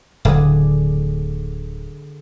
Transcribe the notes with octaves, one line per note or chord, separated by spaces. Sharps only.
D1 D3 D4 G#4